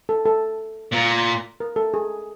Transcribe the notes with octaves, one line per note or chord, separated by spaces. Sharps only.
A4
A4
A#2
A#4
A4
G#4